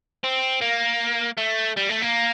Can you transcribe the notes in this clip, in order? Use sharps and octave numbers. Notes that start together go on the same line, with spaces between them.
C4
A#3
A3
G3
A3
A#3